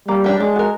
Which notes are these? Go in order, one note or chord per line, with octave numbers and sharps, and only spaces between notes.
G3 A#3
D4 G4 A#4
G#3 D4
F#4 A#4